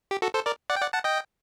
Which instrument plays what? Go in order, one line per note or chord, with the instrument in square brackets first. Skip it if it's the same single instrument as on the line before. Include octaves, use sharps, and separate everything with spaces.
[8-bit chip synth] G4
F#4 A4
A4 C5
A#4 D5
D5 F#5
G5
D5 F#5
F#5 A5
D#5 G5